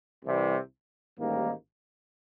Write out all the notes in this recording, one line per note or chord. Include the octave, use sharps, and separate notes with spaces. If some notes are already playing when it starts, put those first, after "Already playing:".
C2 C3 E3 G3
A1 G#2 D#3 G3 A#3